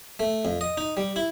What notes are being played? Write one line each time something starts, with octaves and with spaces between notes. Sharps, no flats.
A3
F2
D#5
D#4
G3
E4